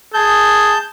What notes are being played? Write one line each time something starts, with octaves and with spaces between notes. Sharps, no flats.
G#4 A5 G6